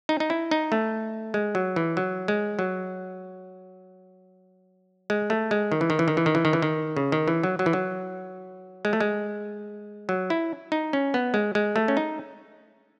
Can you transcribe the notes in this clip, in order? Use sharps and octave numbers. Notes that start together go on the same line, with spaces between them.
D#4
D#4
E4
D#4
A3
G#3
F#3
E3
F#3
G#3
F#3
G#3
A3
G#3
D#3
E3
D#3
E3
D#3
E3
D#3
E3
D#3
E3
D#3
C#3
D#3
E3
F#3
F#3
E3
F#3
G#3
A3
G#3
F#3
E4
D#4
C#4
B3
G#3
G#3
A3
C#4
D#4